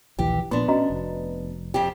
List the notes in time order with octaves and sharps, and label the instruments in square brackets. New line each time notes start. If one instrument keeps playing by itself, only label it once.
[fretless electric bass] A#1 D#2 E3 [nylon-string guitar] G4
[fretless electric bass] A#1 A#2 [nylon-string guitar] B3 D4 [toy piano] C6
[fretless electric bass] C#4 [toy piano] F#4 D#5 A#5
[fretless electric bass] F1
[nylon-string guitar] F2 G4